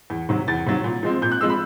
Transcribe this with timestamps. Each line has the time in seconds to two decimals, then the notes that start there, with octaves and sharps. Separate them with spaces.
0.10 E2
0.29 C3 D#3 F#3
0.48 E2 A6
0.66 C3 D#3 F#3
0.84 A#2
1.03 F3 G#3 C4
1.22 A#2 G6
1.32 F#6
1.41 F3 G#3 C4 E6
1.50 B5